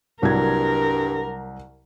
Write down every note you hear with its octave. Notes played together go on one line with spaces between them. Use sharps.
C2 G2 F#3 A#4 G#6